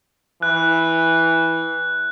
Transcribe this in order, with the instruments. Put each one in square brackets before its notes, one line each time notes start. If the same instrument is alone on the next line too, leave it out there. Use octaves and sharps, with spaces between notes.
[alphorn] E3 [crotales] F#6